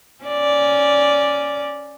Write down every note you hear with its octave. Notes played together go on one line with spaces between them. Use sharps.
C#4 D5